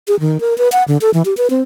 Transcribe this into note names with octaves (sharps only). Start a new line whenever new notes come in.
G#4
D#3
A#4
B4
F#5
D3
A4
E3
G4
B4
C4